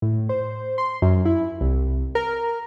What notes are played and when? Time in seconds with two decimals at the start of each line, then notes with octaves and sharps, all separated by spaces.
0.02 A2
0.29 C5
0.78 C6
1.02 F#2
1.25 E4
1.61 C2
2.15 A#4